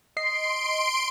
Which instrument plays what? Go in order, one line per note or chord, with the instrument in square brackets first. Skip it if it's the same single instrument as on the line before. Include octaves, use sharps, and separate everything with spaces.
[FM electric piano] D#5 C7 [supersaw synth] C6 D7